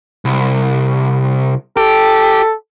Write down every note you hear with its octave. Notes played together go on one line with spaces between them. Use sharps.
C2
G4 A4